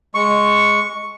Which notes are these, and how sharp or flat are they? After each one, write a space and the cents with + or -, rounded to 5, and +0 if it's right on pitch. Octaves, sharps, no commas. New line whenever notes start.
G#3 +0 C#6 +0